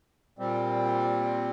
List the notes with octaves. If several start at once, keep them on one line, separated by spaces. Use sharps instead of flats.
A#2 G3 C4